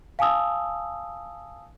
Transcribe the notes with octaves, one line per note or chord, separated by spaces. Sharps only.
F5 G#5 A5 D#6 E6